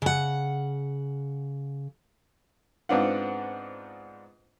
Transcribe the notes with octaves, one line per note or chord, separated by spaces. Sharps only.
C#3 F#5
G#2 B3 C4 D4 F4 F#5